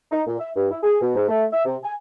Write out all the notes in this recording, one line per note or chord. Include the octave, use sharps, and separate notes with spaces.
D#4
A#2
E5
G2
E4
G#4
B2
G#2
A3
E5
C3
G#5